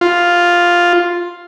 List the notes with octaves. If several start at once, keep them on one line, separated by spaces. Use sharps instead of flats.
F4